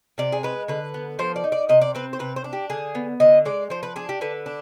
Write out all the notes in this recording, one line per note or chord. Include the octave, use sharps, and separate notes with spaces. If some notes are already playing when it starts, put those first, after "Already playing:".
C3 D5
G#4
G#3 B4
D3 B4
B3
F3 C5
D5
D#4
D5
C3 D#5
D5
C4 B4
C5
C3 B4
C5
D4
G4
D3 G#4
B3
D3 D#5
G#3 D5
F3 C5
B4
D4 G#4
G4
D3 B4
D4